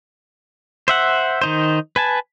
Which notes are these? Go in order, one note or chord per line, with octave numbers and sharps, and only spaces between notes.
C5 E5 F#5
D#3 D#4 C5
B4 G#5 A5